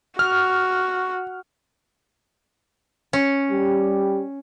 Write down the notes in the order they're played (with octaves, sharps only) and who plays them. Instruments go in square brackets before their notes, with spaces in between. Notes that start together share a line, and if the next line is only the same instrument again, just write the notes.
[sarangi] F#4 [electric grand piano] F6
[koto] C#4
[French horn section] G3 G4